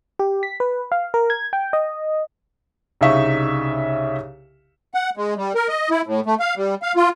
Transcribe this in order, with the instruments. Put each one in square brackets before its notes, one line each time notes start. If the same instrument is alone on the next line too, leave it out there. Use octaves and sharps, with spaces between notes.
[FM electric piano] G4
B6
B4
F5
A#4
G#6
G5
D#5
[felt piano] C2 C#3 D#4 E5 F5 C#6
[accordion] F#5
G#3
G3
A#4
D#5
E4
A2
A3
F5
G3
F5
F4